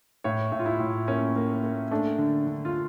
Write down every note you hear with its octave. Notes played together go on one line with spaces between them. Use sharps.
A2 C#5
A2
F4
E4
A2
A#3 C#4
A#3
A#3
A3 D4
D3
D3
F4